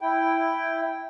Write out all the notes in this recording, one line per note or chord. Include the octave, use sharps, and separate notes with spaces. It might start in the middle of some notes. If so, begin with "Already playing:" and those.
E4 G5